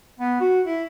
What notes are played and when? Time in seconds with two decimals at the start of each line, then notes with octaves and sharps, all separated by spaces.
0.19 B3
0.40 F#4
0.65 E4